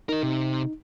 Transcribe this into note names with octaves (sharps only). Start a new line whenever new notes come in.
D#4 A#4 D#5
C3